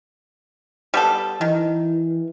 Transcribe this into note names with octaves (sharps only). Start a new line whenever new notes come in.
G3 B3 A4
D#3 E3